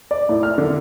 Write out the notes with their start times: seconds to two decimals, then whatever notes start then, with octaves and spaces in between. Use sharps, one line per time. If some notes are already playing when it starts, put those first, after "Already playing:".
0.11 D5
0.29 A2
0.43 F6
0.58 D3